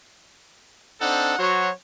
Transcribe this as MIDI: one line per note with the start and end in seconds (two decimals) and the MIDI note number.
1.01 1.38 60
1.01 1.38 62
1.01 1.38 63
1.01 1.38 69
1.01 1.38 78
1.39 1.70 54
1.39 1.70 66
1.39 1.70 72
1.39 1.70 73